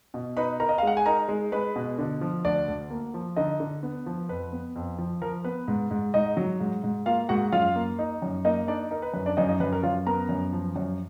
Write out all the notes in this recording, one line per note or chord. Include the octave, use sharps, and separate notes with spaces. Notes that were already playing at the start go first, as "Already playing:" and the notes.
B2
D#4 B4 B5
D#4 A#4 A#5
D#5
F5
G#3 F#5
G#5
D#4 A#4 A#5
G#3
G#3 B4 B5
B2
D3
F3
D2 D4 D5
D2
A#3
F3
D3 D#4 D#5
D3
B3
F3
F2 B4
B3
F2
F3
F3 A#4
B3 B4
G#2
G#2
G#2 D#4 D#5
F#3
G#2
G#2
A#3 F4 F5
G#2 F#4 F#5
F#2 F4 F5
A#3
D#4
F#2
A#3 D#4 D#5
D4 D#4 D5
D#4 A#4
B4
F#2 B4
D4 D5
F#2 D#4 D#5
D#4 D#5
F#2 B4
A#4
F#2 F4 F5
B3 A#4 A#5
F#2
F3
F#2